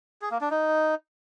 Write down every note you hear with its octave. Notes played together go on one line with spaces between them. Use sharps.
G#4
A#3
D4
D#4